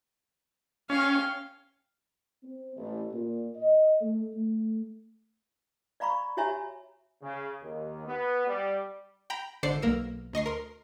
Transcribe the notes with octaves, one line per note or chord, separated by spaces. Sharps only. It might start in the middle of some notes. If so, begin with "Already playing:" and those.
C#4 F5 G5
C4
A1
A#2
D#5
A3
A3
D5 F5 A#5 B5 C#6
F#4 G4 C#5 E5 G#5 A#5
C#3
D#2
B3
G3
G5 A#5 B5
G#1 D3 C5 D5 C7 C#7
B1 A#3 A#4 E6
D2 D#5 C#6 C7
A#4 C6